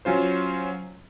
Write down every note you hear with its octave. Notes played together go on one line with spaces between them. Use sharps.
F#3 C#4 F4 C5